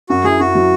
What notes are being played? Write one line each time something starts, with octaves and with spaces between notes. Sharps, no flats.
F#2 F#4
F#3 E4 G#4
F#2 F#4
F#3 E4